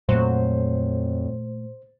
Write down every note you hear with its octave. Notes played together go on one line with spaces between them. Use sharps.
F2 A#2 F#3 A3 C5